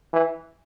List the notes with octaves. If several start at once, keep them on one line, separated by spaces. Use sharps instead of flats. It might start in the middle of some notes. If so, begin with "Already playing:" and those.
E3